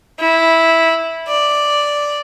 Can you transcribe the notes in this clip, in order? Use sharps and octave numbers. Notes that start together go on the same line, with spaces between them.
E4
D5